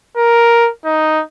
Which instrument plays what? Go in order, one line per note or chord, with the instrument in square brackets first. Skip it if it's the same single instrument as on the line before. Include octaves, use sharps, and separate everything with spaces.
[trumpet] A#4
D#4